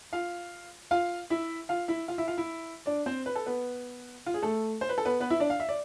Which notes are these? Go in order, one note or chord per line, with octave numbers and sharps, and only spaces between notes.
F4 F5
F4 F5
E4 E5
F4 F5
E4 E5
F4 F5
E4 E5
F4 F5
E4 E5
D4 D5
C4 C5
B4
A4
B3 B4
F4
G#4
A3 A4
C5
B4
A4
B3 B4
B3 B4
E4 E5
D4 D5
F5
E5
D5